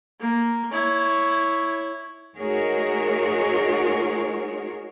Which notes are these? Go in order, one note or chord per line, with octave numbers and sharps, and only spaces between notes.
A#3
E4 C#5
A3 D#4 F#4 G#4 A#4 C#5